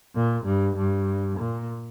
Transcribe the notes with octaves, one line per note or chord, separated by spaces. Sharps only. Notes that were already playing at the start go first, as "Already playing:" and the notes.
A#2
G2
G2
A#2